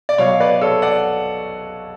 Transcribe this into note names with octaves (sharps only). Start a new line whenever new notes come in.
D5
B2 F#3 C#5 F5
B4 D5
A4 C#5
D5 F#5